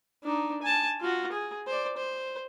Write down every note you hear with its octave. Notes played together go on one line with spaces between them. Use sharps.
D4 D#4
G#5 A5
F4 F#4
G#4
C5 D5
C5